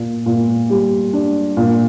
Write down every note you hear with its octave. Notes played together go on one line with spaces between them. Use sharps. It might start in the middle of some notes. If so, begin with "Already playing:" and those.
Already playing: A#2
A#2
G3
D4
A#2